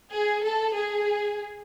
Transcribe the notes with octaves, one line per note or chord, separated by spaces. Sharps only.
G#4
A4
G#4